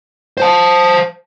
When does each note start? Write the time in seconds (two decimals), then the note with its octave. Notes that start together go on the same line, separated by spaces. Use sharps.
0.38 C5 A5